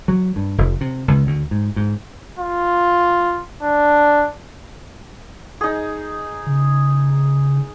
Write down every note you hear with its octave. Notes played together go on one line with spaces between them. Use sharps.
F#3
G2
F1
C3
C#2
D2
G#2
G#2
F4
D4
D#4 G#4
C#3